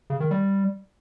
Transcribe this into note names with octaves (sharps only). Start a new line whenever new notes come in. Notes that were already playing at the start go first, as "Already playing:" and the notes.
C#3
D#3
G3